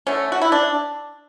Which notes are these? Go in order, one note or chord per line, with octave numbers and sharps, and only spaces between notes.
D3 A3 C#4
F#4
E4
D4